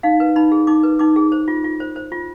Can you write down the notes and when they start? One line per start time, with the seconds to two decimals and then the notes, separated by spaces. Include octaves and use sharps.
0.03 D#4 F5
0.20 B4
0.36 D#4 B5
0.52 G#4
0.67 D#4 D6
0.83 B4
0.99 D#4 D6
1.16 G#4
1.32 C5
1.48 F4
1.64 F4
1.80 C5
1.96 C5
2.12 F4